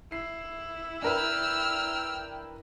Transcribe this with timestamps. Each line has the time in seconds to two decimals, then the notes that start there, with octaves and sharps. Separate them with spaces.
0.12 E4 C7
1.02 D4 A#4 B4 G5 E6 F6